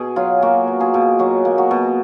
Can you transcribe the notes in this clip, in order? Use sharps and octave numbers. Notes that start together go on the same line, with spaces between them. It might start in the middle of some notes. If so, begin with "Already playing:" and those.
Already playing: B2 G#4
F#3 F4
A#3 F#4
B2
F4 G#4
B2
F#3 F#4 A#4
A#3
F#4
B2